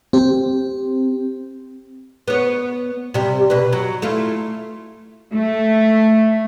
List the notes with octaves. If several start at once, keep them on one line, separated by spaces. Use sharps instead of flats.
C4 G4
B3 C#5
C3 G3
B2 B4
F#3
A3 E4 F4
A3